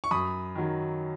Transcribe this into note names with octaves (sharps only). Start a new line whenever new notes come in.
C#6
F#2 B5 D#6
D#3 F#3